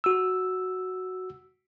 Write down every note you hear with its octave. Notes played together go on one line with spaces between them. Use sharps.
F#4 E6